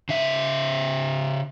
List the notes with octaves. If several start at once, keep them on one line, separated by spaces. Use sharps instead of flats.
C#3 E5